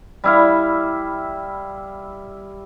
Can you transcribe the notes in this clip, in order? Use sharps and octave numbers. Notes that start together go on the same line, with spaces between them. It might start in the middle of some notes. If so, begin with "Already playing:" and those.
G3 E4 F5